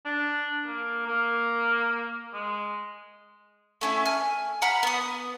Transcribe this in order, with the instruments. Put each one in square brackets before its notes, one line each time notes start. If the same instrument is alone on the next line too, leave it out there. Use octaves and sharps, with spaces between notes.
[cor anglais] D4
A#3
A#3
G#3
[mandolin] A3 C#4 E4
G#5 F6
F#5 A#5 B5 F6
B3 D#6